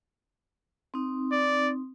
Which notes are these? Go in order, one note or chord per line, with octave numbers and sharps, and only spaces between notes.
C4 D#4
D5